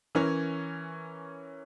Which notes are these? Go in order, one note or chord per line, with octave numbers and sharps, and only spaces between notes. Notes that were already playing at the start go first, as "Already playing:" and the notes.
E3 C#4 A#4 C#5